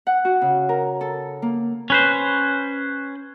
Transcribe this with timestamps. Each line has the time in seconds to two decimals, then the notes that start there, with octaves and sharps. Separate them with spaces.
0.07 F#5
0.25 F#4
0.42 C#3
0.69 A#4
1.01 A4
1.42 A#3
1.90 C#4 B4 C5